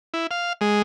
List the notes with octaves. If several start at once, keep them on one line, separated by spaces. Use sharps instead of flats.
E4
F5
G#3